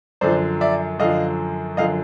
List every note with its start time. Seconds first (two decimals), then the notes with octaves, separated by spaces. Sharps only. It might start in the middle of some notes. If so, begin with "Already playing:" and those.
0.21 F#2 D3 F3 C5 D5
0.61 D5 E5
0.99 F#2 D3 F3 D#5 F5
1.77 F#2 D3 F3 D#5 F5